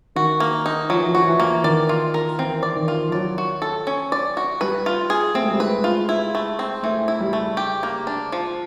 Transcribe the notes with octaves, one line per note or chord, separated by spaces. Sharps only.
D#3 F#4
A#3
D#4
F3 F#3
E3
F3
F#4
E3
A#3
D#3 D5
F4
A#4
E3 C4
D5
D#3
F4
F3
F#3 D5
F#4
A4
C#4
D5
F#4
G3 B4
F4
G#4
A3 C4
G#3
G3
G#3 B4
F4
E4
A3
C4
E3 A3
E4
G3
A3
G4
A#3
D4
F3